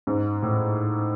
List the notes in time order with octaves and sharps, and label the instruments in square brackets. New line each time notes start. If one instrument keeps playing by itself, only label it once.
[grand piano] G#2
A2